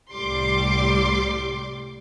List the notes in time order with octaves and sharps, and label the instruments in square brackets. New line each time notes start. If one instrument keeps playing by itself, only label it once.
[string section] C2 A2 G3 C6 D6